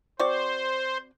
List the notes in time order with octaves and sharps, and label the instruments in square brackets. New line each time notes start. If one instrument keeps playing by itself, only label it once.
[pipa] C4 F#4 D5 [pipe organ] C5